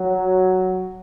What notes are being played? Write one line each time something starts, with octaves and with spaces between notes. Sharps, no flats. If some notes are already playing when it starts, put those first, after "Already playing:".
Already playing: F#3